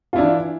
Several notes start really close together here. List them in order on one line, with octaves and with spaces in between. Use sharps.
F4 E4 D4 E3